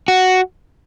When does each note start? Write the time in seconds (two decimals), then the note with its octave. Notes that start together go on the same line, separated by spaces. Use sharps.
0.08 F#4